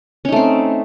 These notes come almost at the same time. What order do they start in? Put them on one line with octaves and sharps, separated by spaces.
C#4 D#4 A3 C4